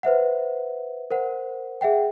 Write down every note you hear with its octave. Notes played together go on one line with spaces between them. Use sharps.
B4 C5 E5 F#5
A#4 C5 F#5
G#4 E5 F#5 G5